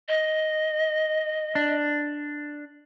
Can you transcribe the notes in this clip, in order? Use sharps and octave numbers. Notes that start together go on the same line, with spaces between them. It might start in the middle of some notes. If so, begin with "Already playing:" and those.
D#5
D4